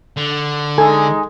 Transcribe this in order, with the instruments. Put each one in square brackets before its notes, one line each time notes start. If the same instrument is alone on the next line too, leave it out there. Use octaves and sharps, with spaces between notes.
[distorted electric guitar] D3
[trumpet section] G#3 D#4 [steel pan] A4 [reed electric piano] G#5